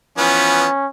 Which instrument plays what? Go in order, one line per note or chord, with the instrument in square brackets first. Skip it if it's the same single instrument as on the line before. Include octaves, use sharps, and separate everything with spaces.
[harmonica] E3 F3 B3 [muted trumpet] C#4